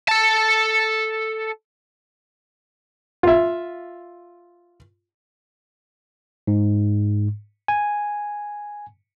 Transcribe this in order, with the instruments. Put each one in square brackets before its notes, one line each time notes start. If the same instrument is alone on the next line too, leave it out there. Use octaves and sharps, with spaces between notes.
[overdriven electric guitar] A4 A5
[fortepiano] F4 E5
[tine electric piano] G#2
G#5